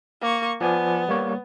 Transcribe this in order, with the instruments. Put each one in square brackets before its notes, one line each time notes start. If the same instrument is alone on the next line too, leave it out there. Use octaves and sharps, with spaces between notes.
[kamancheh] A#3 C#6
[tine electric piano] F3 D5 G#5 [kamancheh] B3
[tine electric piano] G3 A#3 C#5